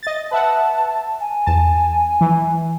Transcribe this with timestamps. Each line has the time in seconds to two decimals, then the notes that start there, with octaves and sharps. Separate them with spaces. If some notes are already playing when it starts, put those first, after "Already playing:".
0.03 D#5 A6
0.31 B4 E5 F#5 A5
1.20 G#5
1.46 E2 A5
2.21 E3